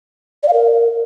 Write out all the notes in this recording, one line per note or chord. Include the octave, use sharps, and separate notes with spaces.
D5
F5
A#4